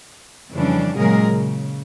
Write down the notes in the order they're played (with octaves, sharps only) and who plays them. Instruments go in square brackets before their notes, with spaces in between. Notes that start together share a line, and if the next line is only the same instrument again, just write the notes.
[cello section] F2 C#3 E3 G3 C#4 D4
A#2 C#3 F#3 G#3 G#4 A#4
C#3